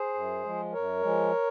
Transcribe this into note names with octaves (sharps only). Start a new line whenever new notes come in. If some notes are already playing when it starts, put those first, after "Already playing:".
Already playing: G#4 C5
F#2
F3 G#3
F#2 A#4 C#5
F3 G#3